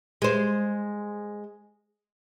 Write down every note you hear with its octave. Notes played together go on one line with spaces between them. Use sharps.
G#3 C5